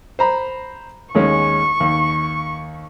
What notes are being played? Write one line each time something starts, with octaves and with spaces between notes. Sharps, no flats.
C5 A#5 B5
D#2 G#3 C#4 C#6
D#2